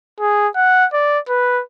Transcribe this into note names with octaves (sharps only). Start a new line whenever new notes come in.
G#4
F#5
D5
B4